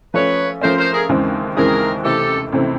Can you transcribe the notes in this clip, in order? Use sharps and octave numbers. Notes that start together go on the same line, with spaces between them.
F3 A3 C#4 B4 C#5
F3 A3 C#4 A#4 C5
A#4 C5
G#4 A#4
D#2 C#3 E3 G#3 C4
D#2 C#3 E3 G#3 C4 G#4 A#4
C#2 C3 E3 A3 C4 G4 A4
C#2 C3 E3 A3 C4